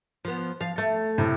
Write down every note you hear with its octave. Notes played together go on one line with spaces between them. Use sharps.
F3 B3
F3 F5
A3
A2 C3